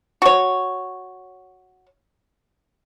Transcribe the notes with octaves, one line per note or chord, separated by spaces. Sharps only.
F#4 C#5